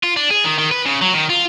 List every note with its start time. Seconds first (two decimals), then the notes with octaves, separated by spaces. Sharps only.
0.03 F4
0.17 D4
0.31 G#4
0.45 D#3
0.58 D#3
0.71 B4
0.85 C#3
1.01 F#3
1.14 D#3
1.30 F4